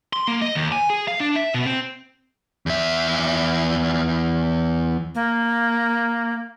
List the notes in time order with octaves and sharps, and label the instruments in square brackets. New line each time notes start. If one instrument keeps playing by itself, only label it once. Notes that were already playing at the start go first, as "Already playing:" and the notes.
[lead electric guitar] C6
A#3
D#5
D#2
G#5
G#4
F5
D4
E5
B2
C4
E2 E5
[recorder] A#3